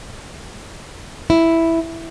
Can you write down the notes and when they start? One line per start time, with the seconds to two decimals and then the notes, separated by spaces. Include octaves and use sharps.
1.30 E4